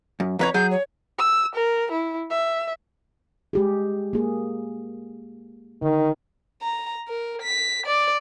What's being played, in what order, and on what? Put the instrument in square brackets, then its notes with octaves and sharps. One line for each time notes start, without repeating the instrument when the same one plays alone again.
[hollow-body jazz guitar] F#2
[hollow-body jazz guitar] F2 B4 C#5 [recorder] A#5
[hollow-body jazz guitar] F#3 G#4 [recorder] G6
[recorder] C#5
[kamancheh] E6
A#4
E4
E5
[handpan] G#3 G4 G#4
A#3 G#4
[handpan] D3 [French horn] D#3
[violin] A#5
A#4
B6
D5